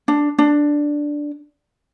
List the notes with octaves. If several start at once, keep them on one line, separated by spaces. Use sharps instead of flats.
D4
D4